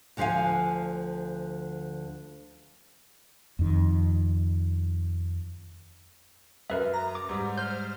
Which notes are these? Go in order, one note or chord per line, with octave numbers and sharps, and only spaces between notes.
D2 D3 F3 B4 F5 G#5
F2 D#3
F#2 A#4 B4 E5
A#5
D6
G#2 G3
C5 F6 G6